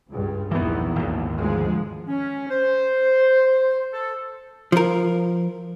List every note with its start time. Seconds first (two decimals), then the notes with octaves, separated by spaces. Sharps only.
0.10 C#2 G2
0.51 A#1 E2 D#3 E3 B3
0.96 G#1 D#2
1.37 D2 F3 G#3
2.08 C#4
2.49 C5
3.93 A4
4.72 F3 A#4